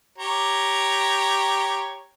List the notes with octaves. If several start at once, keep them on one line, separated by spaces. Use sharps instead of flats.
G4 C#5 A#5